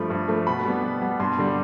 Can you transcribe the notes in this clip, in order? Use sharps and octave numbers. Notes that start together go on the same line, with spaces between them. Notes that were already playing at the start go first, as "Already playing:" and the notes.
Already playing: G2 F3 A3 B5
G2
F3 A3
B2 B5
G3 B3
B2
G3 B3
G2 C6
D3 G3